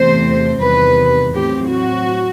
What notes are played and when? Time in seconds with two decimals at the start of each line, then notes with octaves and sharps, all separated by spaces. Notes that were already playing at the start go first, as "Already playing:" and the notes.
Already playing: E2 C3 E3 A3 C4 C5
0.61 E2 C3 D#3 G3 B4
1.33 A2 F#3 C4 G4
1.68 F#4